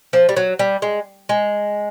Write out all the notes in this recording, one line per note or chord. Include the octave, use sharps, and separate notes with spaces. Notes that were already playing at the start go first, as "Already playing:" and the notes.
F3
G3
F#3
G3
G#3
G#3